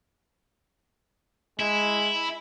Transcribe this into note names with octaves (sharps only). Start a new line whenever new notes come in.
G#3 E4